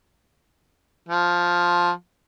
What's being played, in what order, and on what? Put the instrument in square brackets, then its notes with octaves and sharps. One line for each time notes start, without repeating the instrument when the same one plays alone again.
[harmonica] F3